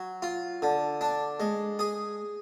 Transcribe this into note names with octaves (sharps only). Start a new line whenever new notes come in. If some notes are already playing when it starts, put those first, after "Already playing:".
Already playing: F#3
F4
D3
D4
G#3
G#4